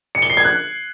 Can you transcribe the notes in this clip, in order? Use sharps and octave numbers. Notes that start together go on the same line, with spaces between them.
C#7
G7
C7
G#6
F#6